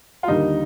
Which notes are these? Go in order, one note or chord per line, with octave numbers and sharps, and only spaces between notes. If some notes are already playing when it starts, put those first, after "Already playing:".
F4
D#2 D3 G3 D#4